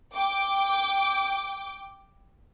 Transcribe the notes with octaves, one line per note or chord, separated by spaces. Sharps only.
G5 D6